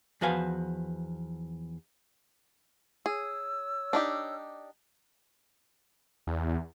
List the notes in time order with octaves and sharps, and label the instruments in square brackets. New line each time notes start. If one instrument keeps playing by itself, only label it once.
[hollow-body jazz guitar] E2 F3 F#4 B4 F5 G#5
[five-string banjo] G#4 [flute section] C#5 E6
[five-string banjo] D4 D#4 G4
[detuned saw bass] E2